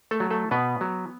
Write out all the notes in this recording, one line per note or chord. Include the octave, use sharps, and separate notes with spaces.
A3 A4
F#3
A3 A4
B2 B3 B4
F#3